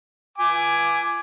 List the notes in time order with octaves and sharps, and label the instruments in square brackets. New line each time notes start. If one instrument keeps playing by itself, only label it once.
[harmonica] G#5 D6